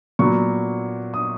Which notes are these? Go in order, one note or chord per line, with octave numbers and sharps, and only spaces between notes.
A#2 F#3 B3 C#6
D#6